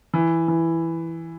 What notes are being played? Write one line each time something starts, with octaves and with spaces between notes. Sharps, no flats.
E3
E3